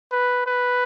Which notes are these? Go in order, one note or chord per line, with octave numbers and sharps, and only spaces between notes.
B4
B4